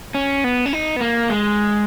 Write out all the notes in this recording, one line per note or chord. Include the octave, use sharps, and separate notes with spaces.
C#4
B3
C#4
D#4
B3
A#3
G#3